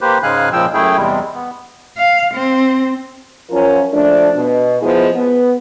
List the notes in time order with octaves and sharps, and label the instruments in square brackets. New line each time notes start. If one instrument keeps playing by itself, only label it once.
[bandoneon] A#3 G4 B4 C5
G#2 C#3 G#3 F5 G#5 F#6
A#2 C#3 F3 G#3 G5 E6
F#2 A3 E4 G#4 G5
E2 C3 G3 G#3
B3
[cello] F5
C4
[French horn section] F#2 F3 C#4 F4 A#4
F3 A3 D4
B2
F3 G#3 B3 E4 G#4
B3